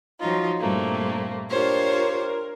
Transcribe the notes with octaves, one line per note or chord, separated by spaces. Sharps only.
F3 F#3 D#4 F4
G2 A#2 G3 A3 A#3 C4
D4 F4 G4 A#4 C5 C#5
A#4